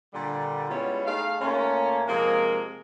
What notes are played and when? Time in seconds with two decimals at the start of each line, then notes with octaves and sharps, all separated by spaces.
0.14 A#2 D3 G3
0.69 G3 G#3 B3 C#4 E4 F4
1.05 A3 D#4 G#4 F5
1.41 A#2 A3 A#3 C#4
2.08 C3 F3 G#3 A#3 G#4 A#4